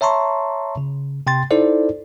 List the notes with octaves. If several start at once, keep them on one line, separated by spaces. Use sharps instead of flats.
C#5 E5 A5 A#5 C6 C#6
C#3
C3 G5 C6 A6
D#4 E4 A4 C5 D5